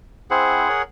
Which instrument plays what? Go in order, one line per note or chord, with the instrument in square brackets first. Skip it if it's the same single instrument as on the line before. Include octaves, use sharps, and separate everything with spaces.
[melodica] C4 E4 C5 [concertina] G#4 F#5
[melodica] A#4 C#5